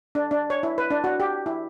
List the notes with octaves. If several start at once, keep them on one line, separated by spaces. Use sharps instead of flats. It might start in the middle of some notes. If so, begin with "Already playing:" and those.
D4
D4
C#5
E4
B4
D4
F#4
G4
E4